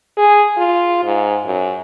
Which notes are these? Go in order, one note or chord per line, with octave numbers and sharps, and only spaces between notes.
G#4
F4
G#2
F#2